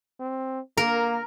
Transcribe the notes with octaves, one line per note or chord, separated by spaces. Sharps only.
C4
A#3 A#4